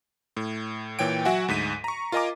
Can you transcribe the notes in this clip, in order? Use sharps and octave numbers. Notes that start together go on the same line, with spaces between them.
A2
A#2 E3 C#5 G5 D7
F#3 F#4 E5 F#5 G#5
D2 G#2 B6 D#7
A#5 C#6
F4 A#4 D#5 G#5 A#5 D6